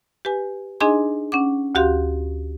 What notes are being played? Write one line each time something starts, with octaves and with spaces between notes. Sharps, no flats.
G4 B4 G#5
D4 D#4 G#4 D#5 G#5 C6
C#4 F#5 D6
D2 F#4 G4 F5 C6